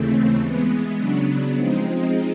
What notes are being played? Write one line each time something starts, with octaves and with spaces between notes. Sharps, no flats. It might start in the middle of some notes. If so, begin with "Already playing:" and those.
Already playing: D#2 C#3 E3 A3 C4
E3 G#3 B3
C#3 F#3 B3 D4
F3 G#3 C4 D#4